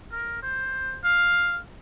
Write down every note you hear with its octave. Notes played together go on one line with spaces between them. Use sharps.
A#4
C5
F5